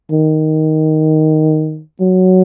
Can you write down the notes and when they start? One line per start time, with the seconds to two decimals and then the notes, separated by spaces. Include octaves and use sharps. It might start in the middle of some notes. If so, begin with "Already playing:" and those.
0.11 D#3
2.01 F#3